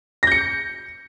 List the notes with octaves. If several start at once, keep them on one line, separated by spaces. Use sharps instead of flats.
G6 A#6 C#7